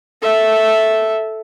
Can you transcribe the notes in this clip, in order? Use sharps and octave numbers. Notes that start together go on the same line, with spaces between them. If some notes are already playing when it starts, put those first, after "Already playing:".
A4 E5